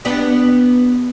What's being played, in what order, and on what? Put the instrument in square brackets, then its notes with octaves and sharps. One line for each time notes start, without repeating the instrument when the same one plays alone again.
[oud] B3 D4 G4